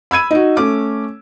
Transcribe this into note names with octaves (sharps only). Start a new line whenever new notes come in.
B5 E6 G#6 D#7
D#4 F#4
A3 C#4 D6